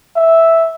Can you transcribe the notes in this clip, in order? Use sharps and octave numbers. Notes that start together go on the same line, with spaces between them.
E5